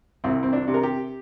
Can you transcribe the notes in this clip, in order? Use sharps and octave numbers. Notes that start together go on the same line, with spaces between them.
C2 C4
C4
D4
C3
A#4
G4